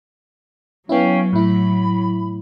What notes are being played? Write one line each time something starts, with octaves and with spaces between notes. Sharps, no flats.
F#3 B3 C#4 E4 F5 G5
A2 E4 B5